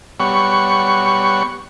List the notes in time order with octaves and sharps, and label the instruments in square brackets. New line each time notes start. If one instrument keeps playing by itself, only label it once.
[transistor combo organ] G3 B3 C#5 F#5 C#6